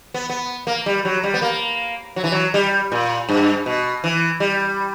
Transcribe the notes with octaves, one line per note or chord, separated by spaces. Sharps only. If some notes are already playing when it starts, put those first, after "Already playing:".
B3
B3
A#3
G3
F#3
G3
B3
A#3
F#3
E3
F#3
G3
A#2
G2
B2
E3
G3